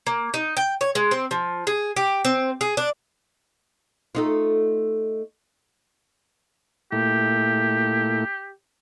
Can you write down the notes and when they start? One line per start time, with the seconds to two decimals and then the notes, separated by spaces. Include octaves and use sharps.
0.07 A#3
0.34 D#4
0.57 G5
0.81 C#5
0.95 G#3
1.11 C4
1.31 F3
1.67 G#4
1.96 G4
2.25 C4
2.61 G#4
2.77 D4
4.15 A3 D#4 F4
6.92 A#2 A3 E4 G4